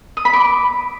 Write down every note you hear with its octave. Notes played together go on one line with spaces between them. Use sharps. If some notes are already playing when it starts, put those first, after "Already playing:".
D#6
B5
D6